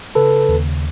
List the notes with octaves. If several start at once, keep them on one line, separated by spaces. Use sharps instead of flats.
C#3 A4 B4
D#2